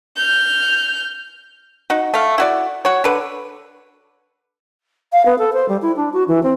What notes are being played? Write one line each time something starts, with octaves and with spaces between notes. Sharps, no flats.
F6 G6
D#4 F#4
A3 F5
E4 F#4 D5
F#4 C#5
D3 B4
F5
B3
A4
C5
G3
E4
D4
F#4
E3
C4